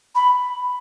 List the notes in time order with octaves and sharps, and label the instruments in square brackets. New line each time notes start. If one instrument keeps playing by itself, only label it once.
[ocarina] B5